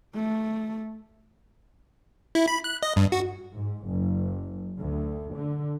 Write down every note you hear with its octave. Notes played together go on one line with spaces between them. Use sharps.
A3
E4
B5
F#6
D#5
G2
F#4
G#2
F#1
D2
D3